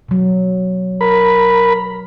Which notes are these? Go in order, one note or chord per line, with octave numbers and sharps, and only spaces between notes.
B2 F#3
A#4 B5